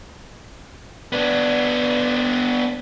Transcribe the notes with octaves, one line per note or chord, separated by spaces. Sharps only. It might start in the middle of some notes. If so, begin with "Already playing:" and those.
B3 D4